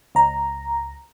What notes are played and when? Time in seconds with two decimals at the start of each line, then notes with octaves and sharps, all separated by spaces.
0.15 C#2 A#5